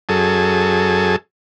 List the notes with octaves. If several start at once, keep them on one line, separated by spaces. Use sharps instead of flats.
F#2 G#4 A4